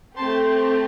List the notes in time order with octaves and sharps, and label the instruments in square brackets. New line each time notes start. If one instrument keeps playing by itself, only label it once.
[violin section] A3 C4 G4 A5 C6